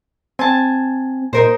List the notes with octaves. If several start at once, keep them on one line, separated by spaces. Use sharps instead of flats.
C4 G#5 A5
A#2 D#4 A#4 C5